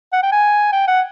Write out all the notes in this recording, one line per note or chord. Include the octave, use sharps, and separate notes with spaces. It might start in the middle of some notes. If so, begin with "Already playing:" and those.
F#5
G5
G#5
G5
F#5